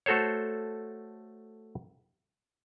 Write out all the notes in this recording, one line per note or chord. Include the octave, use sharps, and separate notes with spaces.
A3 F#4 A4 C5 C#5